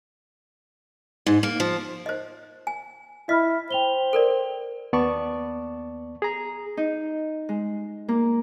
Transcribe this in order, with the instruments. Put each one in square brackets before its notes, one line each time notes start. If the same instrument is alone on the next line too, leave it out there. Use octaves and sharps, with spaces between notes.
[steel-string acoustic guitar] G#2
A#3
F3
[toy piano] C5 D#5
G#5
[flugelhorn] E4 [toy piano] D#5 [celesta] B5 F6 B6
[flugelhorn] C5 [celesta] G5 F7 G7
[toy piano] A4 A#4 D5
[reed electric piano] D#2 B3 D5 A5 C#6
G#4 A#5
[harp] D#4
G#3
A#3